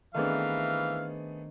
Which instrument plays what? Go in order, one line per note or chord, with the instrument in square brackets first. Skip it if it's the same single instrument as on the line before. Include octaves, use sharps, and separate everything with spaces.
[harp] D#3 C4 D4 [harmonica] E3 F5 [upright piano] A3 B3 G#4